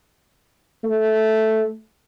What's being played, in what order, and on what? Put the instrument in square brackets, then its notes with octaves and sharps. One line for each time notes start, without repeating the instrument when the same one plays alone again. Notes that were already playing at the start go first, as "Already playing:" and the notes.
[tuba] A3